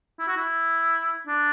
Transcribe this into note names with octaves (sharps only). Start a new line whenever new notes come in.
E4
F#4
E4
D4